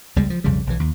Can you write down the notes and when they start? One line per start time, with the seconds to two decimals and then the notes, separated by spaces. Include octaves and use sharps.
0.16 C#2 G3 G#3
0.30 F3
0.44 B1 F2 C#3 G3
0.67 B1 E3
0.80 D#2